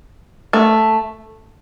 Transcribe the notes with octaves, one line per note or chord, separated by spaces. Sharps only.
A3